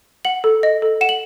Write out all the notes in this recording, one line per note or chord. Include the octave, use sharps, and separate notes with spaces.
F#5 F#7
A4
D#5
A4
F#5 E7
F#7